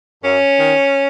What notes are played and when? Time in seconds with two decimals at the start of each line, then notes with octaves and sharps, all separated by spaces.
0.24 F#2 C#4
0.59 D#3